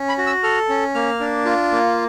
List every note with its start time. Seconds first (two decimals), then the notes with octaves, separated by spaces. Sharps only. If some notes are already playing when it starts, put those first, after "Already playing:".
Already playing: C#4
0.09 B5
0.18 F#4
0.26 E6
0.43 A4 F6
0.69 C#4
0.95 A#3 F6
1.20 D4
1.45 F4
1.72 A#3